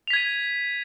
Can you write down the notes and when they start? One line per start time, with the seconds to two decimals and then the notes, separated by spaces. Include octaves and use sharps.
0.07 F7
0.10 B6
0.13 G#6
0.16 D#7